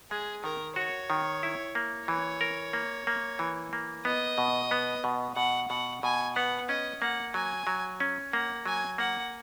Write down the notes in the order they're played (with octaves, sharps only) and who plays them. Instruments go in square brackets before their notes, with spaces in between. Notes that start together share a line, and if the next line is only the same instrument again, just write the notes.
[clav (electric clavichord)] G#3 [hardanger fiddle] G#4
[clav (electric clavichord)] D#3 [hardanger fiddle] A#4
[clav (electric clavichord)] F#4 [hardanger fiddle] C#5
[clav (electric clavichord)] D#3
E4
A#3
[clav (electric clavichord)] E3 [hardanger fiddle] C#5
[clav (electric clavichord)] A#4
A#3
A#3
E3
A#3
[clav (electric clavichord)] B3 [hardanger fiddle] D#5
[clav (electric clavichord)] B2
B3
B2
[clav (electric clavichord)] B2 [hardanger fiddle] F#5
[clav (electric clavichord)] B2 [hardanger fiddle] F#5
[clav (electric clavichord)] B2 [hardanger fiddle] G#5
[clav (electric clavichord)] B3 [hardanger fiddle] F#5
[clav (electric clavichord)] C#4 [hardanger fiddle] D#5
[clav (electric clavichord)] A#3 [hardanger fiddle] F#5
[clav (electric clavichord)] F#3 [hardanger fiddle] G#5
[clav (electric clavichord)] F#3
C#4
[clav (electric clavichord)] A#3 [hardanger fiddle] F#5
[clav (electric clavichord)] F#3 [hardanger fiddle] G#5
[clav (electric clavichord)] A#3 [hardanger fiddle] F#5